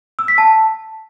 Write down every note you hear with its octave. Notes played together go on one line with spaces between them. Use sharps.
E6
B6
A5